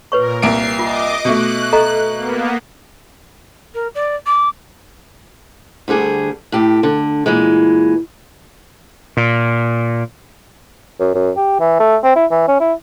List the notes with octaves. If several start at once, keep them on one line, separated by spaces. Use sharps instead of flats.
A#2 A#4 B4 C#5 C#6
C2 A#3 C7 D7
F4 D#5 D6
B2 A3 F#6
A4 D#5 A#5
A#3 B3
A#4
D5
D6
D2 D3 G3 G#4
A2 G4
D3
A#2 E3 G#3
A#2
F#2
F#2
G4
E3
A3
C4
E4
E3
C#4
E4